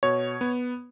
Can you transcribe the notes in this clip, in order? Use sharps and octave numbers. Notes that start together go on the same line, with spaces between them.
B2 C#5
B3